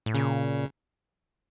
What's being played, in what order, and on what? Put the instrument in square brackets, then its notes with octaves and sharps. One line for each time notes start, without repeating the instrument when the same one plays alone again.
[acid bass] A2
[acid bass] A#2 [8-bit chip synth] C#3